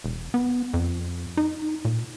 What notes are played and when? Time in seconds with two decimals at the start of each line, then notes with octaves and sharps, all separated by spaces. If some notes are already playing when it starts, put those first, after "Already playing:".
0.04 E1
0.34 B3
0.74 F2
1.37 D#4
1.85 A#2